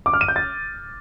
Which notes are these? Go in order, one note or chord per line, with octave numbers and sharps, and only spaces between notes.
D6
F6
D#7
G6
A6